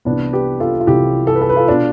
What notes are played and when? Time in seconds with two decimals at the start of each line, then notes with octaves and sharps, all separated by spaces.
0.05 C2 C3 E3 B3 D4
0.33 G4 B4
0.60 F4 A4
0.80 F4
0.87 C2 C3 E3 E4 G4
1.27 A4
1.35 B4
1.42 A4
1.49 B4
1.56 F4 A4
1.68 B2 D4 F4